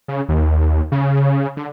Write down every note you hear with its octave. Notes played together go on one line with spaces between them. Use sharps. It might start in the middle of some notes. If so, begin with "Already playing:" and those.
C#3
D#2
C#3
D3